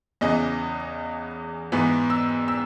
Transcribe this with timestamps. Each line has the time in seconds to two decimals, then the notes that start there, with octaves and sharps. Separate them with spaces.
0.21 E2 C#3 E3 D#5
1.72 G#2 E3 B3
2.10 E6
2.48 E6